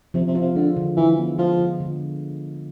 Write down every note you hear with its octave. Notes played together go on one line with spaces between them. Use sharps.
C3 F3
C3
F4
C3
D3 G#3
D3
D3 E3
B3
F3 G#3
D3
D3